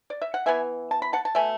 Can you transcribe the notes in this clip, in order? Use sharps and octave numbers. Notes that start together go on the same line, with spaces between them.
D5
E5
F#5
E3 B3 E5 G#5
A5
B5
F#5 A5
A5
B2 A3 E5 G#5